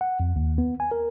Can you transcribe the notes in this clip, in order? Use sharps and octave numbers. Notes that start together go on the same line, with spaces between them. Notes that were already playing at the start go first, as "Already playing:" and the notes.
F#5
F2
D#2
B3
G#5
A#4